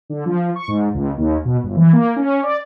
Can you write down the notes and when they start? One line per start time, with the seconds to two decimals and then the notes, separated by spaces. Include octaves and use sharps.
0.10 D3
0.26 F3
0.56 C#6
0.68 G#2
0.94 C#2
1.17 D#2
1.45 B2
1.63 G1
1.77 E3
1.93 A#3
2.16 C#4
2.43 D5